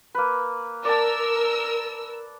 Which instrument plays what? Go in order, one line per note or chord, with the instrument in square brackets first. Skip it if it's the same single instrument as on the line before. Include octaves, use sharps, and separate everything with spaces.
[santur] A#3 B4
[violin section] A#4 E6 [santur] D5 A5